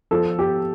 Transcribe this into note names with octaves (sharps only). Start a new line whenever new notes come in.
F3 A4
G4